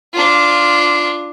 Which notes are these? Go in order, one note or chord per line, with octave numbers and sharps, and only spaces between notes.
D4 F4